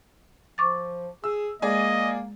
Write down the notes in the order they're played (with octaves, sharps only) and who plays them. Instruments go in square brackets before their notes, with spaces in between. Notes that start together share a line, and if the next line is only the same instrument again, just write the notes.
[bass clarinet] F3 [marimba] C#6 D6 A6
[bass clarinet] G#4 [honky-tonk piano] E6
[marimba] G#3 [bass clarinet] A#3 [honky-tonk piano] G#4 D5 G#5 [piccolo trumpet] D#5